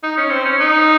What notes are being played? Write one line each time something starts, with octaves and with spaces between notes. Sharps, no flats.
D#4
C#4
C4
C#4
D#4